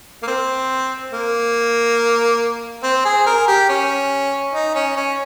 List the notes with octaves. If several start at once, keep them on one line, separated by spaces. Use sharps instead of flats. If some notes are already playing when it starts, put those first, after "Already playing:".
A#3
C4
A#3
C4
G#4
A#4
G4
C#4
D#4
C#4
C#4